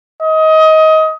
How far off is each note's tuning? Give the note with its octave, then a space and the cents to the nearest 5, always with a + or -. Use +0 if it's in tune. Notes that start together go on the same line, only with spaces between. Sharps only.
D#5 +20